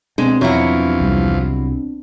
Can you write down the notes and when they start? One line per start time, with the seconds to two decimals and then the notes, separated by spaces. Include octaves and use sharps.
0.18 B2 G#3 B3 C4 D4
0.41 E2 F3 F#3 E4 F#4
1.00 C2 G3